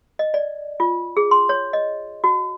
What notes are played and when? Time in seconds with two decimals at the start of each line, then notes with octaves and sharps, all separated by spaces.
0.19 D#5
0.34 D5
0.80 F4
1.17 G#4
1.31 C6
1.49 C#5
1.73 D#5
2.24 F#4